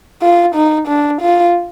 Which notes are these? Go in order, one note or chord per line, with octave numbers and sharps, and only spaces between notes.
F4
D#4
D4
F4